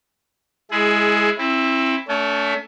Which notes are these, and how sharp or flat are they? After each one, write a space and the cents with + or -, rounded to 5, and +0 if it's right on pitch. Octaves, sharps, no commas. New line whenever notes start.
G#3 +0 E4 +0 G#4 +20
C4 +30 E4 +0
A3 +5 C#4 +40